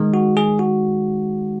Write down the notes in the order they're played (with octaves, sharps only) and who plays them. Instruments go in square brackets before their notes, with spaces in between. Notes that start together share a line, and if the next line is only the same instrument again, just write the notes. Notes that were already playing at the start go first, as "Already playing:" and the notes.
Already playing: [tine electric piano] D#3 G#3
F#4
G#4
F#4